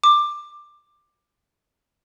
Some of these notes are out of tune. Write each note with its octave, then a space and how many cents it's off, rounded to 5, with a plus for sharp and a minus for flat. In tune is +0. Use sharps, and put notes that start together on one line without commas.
D6 +15